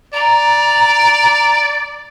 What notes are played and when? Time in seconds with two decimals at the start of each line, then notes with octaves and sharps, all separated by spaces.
0.14 D5 A#5